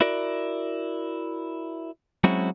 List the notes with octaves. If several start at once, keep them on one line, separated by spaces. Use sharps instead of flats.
E4 F#4 A#4 D5
F#3 G#3 C4 C#4 E4 F#4